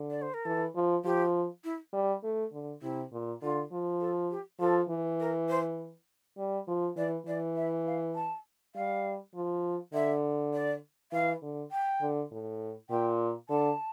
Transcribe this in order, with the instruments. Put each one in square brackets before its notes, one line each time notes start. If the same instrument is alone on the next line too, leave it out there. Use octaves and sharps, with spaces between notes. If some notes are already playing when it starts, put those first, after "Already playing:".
Already playing: [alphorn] D3
[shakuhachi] D5
C5
A#4
[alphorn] E3 [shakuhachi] A4
[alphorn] F3
[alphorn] F3 [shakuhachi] G4
[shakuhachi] E4
[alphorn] G3
A3
D3
[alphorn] C3 [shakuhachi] E4
[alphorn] A#2
[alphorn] D3 [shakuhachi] F4
[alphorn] F3
[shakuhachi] A4
G4
[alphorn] F3 [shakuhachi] A4
[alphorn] E3
[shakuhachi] A#4
C5
[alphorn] G3
F3
[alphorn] E3 [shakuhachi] D5
[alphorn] E3 [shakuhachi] D5
[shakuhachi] E5
F5
A5
[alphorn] G3 [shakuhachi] F5
[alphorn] F3
[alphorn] D3 [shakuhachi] E5
[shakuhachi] D5
[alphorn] E3 [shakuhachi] F5
[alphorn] D3
[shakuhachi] G5
[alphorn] D3
A2
[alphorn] A#2 [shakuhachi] G5
[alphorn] D3 [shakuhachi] A5